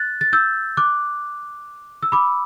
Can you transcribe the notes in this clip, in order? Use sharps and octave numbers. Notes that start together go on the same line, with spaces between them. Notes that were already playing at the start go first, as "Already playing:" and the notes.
Already playing: F#6 A6
A6
E6 G6
D6 F#6
E6
B5 D6